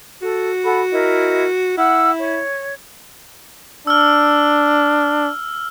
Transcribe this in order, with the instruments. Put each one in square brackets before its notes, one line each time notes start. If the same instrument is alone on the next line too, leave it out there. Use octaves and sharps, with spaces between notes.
[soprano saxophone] F#4 [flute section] A4
[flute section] A4 F#5 B5
E4 A#4 D#5
[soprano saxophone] E4 [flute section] F#5 E6 F6
[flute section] C#5
[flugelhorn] D4 [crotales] E6 F6